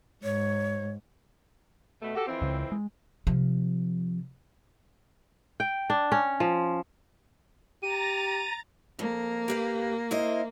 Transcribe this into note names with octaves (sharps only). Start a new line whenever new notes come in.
G#2 C#5
B2 A3
F#4 G4 A4
F2 E3 C4
C#2 C#3
G#3
C3 F3
G5
D4
C#4
F3
G4 A#5 A6 D#7
F2 A#3
G4 B4 F5
E4 C5 D#5